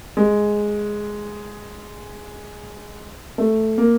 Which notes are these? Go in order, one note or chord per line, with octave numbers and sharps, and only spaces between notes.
G#3
A3
A#3